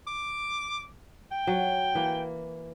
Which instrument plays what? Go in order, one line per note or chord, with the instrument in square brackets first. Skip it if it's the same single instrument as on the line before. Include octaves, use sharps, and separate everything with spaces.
[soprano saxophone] D6
G5
[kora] F#3
E3 A#3